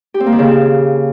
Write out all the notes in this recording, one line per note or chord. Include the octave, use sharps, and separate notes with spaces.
G4
C4
A#3
D#3
C#3